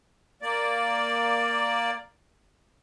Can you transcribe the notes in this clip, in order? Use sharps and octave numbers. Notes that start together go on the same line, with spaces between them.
A#3 D5